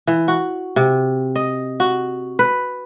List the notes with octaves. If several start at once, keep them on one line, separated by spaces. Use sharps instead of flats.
E3
F#4
C3
D#5
F#4
B4